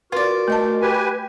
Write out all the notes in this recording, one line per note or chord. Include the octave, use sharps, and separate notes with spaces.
F4 F#4 A#4 B4 D5
A3 D#5 A5
G4 B4 G#5